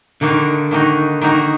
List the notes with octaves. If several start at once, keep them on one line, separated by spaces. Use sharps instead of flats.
D3 D#3 A#3 D#4 F#4
D#3 A#3 D#4 F#4
D#3 A#3 D#4 F#4